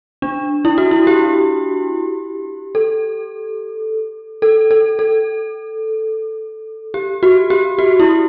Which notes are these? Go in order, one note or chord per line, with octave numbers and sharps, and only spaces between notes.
D4
E4
F#4
E4
G4
A4
A4
A4
A4
G4
F#4
G4
F#4
E4